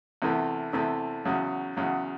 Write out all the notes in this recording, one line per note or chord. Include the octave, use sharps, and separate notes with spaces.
E2 C3 E3 A3
E2 C3 E3 A3
E2 C#3 F#3
E2 C#3 F#3